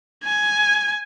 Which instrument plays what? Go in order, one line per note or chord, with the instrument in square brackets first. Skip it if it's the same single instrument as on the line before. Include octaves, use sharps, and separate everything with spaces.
[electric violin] G#5